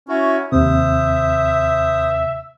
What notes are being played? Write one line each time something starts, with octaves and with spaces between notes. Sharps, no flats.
C#4 E4 F#4
D#2 C3 C5 E5 D#6